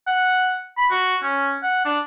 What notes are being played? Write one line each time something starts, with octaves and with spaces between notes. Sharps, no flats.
F#5
B5
F#4
C#4
F#5
D4